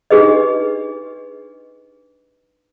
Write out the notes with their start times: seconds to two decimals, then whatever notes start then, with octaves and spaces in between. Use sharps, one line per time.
0.10 D4 D#4 G4 G#4 B4 D#5